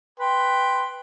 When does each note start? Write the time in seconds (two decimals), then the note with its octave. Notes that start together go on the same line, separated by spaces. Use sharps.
0.20 B4 G5 C6